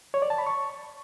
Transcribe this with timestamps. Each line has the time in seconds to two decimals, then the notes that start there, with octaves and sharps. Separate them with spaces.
0.14 C#5
0.22 D5
0.30 A5
0.38 B5
0.47 C#6